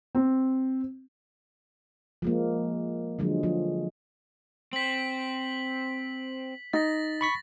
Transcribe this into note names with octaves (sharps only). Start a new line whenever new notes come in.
C4
F3 G#3 A#3
D3 F3 F#3 G#3
F3
C4 B6 F#7
D#4 A6 A#6
B5 C#6 B6